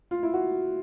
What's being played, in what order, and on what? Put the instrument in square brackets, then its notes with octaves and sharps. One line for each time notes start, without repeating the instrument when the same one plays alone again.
[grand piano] F4
E4
F#4